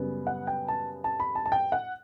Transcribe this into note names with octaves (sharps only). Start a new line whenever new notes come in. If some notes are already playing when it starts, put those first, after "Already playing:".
Already playing: F#2 C#3 G3 B3
F#5
G5
A5
A5
B5
A5
A5
G5
F#5